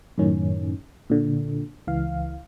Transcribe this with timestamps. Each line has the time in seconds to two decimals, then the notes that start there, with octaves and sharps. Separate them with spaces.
0.18 F#2 A2 D#3 C#4
1.10 A#2 D3
1.87 C#2 E3 F5